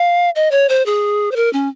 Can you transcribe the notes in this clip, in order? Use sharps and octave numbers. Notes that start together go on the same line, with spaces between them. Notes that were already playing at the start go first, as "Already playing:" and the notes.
Already playing: F5
D#5
C#5
C5
G#4
C5
A#4
C#4